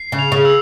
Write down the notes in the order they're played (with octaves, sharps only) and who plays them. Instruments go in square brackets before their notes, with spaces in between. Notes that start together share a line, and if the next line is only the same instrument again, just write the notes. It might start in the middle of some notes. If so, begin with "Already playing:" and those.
Already playing: [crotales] C7
[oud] C#3
[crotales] F7
[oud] C#3
[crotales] E6